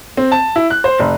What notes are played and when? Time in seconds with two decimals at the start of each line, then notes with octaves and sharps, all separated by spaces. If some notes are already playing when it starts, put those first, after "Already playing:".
0.17 C4
0.32 A5
0.56 E4
0.70 F#6
0.84 C5
1.00 F1